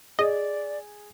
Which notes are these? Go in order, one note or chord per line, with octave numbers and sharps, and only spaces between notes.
G#4 D5 D#5